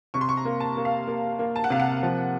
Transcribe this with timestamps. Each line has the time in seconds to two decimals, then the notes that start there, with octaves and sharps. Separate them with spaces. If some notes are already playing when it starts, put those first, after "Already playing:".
0.14 C3 C#6
0.21 C6
0.29 C#6
0.37 A#5
0.45 A#3
0.60 A5
0.77 A#3
0.85 F5
1.07 A#3
1.39 A#3
1.56 A5
1.64 F#5
1.70 C3 F5
1.80 F#5
2.03 F3